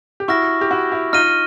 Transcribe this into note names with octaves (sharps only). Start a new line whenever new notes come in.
G4
E4 F#4 C#6 F6 A#6
G4
E4 F#4
E4 F#4
D#4 F4 F6 A#6 D#7 G7